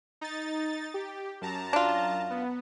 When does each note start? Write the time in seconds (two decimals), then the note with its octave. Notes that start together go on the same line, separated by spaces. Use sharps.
0.21 D#4 A6
0.94 G4
1.41 F#2 A5 A#5
1.73 D4 F4
2.30 B3